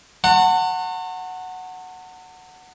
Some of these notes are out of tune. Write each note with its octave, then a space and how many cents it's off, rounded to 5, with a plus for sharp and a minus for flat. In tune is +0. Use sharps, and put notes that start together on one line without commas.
F#5 +0 A5 +45 C#6 -40